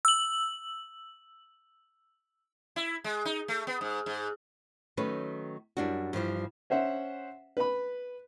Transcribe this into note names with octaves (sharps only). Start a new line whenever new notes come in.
E6 F#7
E4
G#3
D#4
A3
B3
G#2
G#2
D#3 F#3 A3 C#4 B4
F#2 G3 D4 E4 F#4
G2 E3 F3 G3
C#4 C5 E5 F#5
B4 B5